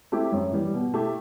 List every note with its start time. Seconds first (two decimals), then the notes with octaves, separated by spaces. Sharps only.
0.12 A3 C4 E4 G4
0.32 F#2
0.53 E3 G3
0.73 B2
0.94 A3 E4 G4